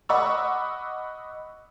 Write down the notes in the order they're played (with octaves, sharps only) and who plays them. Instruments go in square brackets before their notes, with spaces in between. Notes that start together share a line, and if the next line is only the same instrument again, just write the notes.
[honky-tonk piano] D#5 F#5 B5 C#6 D6 E6